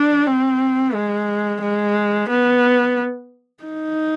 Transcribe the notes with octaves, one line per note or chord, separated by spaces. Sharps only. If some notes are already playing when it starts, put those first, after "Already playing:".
Already playing: D4
C4
G#3
G#3
B3
D#4